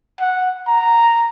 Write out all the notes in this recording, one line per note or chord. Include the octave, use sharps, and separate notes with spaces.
F#5
A#5